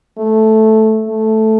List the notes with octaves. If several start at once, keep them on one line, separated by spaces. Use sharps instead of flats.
A3
A3